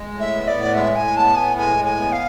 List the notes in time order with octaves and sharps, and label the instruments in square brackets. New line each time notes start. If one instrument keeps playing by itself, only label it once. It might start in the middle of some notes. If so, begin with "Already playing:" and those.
Already playing: [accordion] G#3
A2
[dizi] E5
[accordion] B3
[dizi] D5
[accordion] A2
[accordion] G#3 [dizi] E5
[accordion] A2 [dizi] G#5
[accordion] B3 [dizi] A5
[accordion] A2 [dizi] G#5
[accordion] G#3 [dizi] G#5
[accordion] A2
[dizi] G#5
[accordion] B3
[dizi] F5